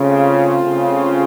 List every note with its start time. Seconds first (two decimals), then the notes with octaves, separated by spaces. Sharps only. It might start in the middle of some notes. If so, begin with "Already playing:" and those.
Already playing: C#3 A3 C4 F4
0.65 C#3